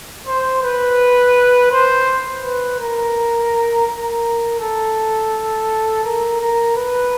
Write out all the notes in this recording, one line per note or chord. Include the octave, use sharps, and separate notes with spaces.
C5
B4
C5
B4
A#4
A#4
A4
A#4
A#4
B4